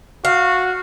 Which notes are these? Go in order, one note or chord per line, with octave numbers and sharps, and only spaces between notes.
F#4 F5